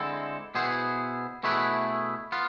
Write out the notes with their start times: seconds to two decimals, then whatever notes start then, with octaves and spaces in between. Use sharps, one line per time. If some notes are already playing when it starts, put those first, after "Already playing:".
Already playing: D3 G#3 C4 E4 A4
0.55 B2 B3 E4 G#4 C5
1.43 B2 A3 E4 G#4 B4
2.32 B3 F4